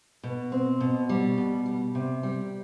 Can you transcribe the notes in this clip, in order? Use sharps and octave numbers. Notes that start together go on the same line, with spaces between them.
B2
C4
B2
G3
B2
G3
C3
G3